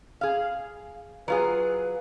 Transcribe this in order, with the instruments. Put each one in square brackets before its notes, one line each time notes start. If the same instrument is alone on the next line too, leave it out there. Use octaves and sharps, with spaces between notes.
[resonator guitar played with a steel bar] G#4 F5
[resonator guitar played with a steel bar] F#3 F4 G#4 [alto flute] B4